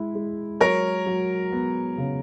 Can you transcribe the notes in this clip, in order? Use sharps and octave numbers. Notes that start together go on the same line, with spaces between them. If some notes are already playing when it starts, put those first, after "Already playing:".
Already playing: G#3 E4
G#3
F#3 A#4 C#5
F#3
B3
C#3